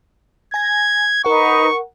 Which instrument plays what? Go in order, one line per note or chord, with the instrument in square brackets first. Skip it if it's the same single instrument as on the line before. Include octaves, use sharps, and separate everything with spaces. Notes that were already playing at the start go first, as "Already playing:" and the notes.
[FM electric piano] G#5 A#6 [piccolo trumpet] G#6
[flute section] D#4 B4 [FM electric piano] A#4 F#5 [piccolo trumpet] C#6